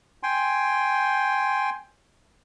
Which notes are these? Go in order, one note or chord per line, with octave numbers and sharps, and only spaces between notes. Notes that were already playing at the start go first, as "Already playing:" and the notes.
G5 G#5 C6